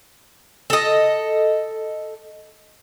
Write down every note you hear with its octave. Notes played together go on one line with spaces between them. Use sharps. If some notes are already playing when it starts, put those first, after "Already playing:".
A4 D#5